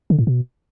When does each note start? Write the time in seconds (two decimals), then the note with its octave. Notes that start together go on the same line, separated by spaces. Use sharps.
0.10 D3
0.19 A2
0.27 B2